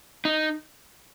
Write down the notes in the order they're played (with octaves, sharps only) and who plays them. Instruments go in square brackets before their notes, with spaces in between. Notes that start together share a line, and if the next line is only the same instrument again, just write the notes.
[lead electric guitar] D#4